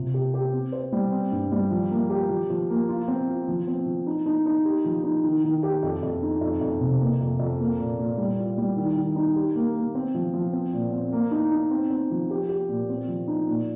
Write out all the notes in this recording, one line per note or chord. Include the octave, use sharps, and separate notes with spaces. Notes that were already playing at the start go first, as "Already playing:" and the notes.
Already playing: C3 F4
G4
G4
C4
C5
G3
C4
G2
G3
F3
A#3
G4
F3
F3
A#3
F4
C4
F4
F3
C4
F3
D#4
D#4
D#4
G4
F3
D#4
D#3
D#3
G4
F2
F2
D#4
F2
F2
C3
A#3
F2
F2
A#3
A#2
A#2
G3
F4
G3
D#3
D#3
D#4
G4
A#3
A#3
C4
F3
F3
C4
A#2
C4
A#3
D#4
D#4
C4
C4
F3
G4
G4
A#2
C4
F3
D#4
A#2